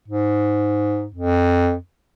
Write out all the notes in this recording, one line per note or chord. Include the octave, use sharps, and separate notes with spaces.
G#2
F2